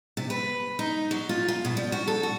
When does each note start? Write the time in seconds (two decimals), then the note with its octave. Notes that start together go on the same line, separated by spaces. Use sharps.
0.17 C3
0.30 B4
0.79 D#4
1.11 F#3
1.29 F4
1.48 F4
1.65 B2
1.77 G3
1.92 F#4
2.08 A4
2.23 F#4